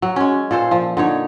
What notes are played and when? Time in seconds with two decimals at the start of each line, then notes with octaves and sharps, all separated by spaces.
0.02 F#3
0.16 G#3 C#4
0.51 A#2 A4 C5
0.71 F3
0.97 D3 D#4 C#5